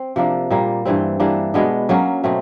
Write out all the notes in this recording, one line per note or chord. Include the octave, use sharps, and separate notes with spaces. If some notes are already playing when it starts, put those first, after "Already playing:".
Already playing: C4
C3 F3 A#3 D4
A#2 G3 A#3
G2 E3 G3 C4
E3 G3 A#3 D4
B2 G#3 B3 D4
F#3 A#3 C#4 F#4
B2 F#3 A3 C4